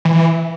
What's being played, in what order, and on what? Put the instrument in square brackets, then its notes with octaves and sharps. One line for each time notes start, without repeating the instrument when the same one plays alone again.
[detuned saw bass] E3